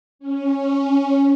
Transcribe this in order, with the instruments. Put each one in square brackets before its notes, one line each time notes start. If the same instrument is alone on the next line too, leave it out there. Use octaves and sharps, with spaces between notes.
[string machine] C#4